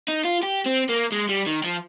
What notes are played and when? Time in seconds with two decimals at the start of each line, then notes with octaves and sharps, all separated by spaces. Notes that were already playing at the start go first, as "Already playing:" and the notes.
0.08 D#4
0.25 F4
0.43 G4
0.66 C4
0.89 A#3
1.12 G#3
1.29 G3
1.47 D#3
1.64 F3